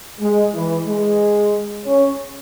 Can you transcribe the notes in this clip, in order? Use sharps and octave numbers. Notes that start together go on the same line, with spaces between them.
G#3
E3
G#3
C#4